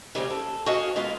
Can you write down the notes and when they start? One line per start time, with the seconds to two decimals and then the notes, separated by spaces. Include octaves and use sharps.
0.15 C#3 G3 G#3 A#3 C4 F4
0.30 A4
0.66 F#4 G#4 C5 D#5 F5
0.96 G#3 A#3 B3 E4 F4